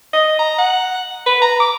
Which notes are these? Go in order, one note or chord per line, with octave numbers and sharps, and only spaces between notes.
D#5
A#5
F#5
B4
A#5
D6